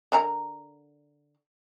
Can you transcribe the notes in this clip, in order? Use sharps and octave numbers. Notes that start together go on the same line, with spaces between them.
D3 A#4 A#5